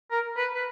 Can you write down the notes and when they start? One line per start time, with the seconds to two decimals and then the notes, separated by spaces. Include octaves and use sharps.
0.11 A#4
0.37 B4
0.54 B4